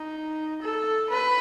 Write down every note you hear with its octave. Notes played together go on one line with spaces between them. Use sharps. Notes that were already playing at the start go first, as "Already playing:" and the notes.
Already playing: D#4
A4
B4